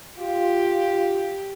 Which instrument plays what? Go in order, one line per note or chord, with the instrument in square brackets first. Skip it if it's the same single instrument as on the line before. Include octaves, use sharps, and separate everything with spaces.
[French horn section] F4 [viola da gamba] G4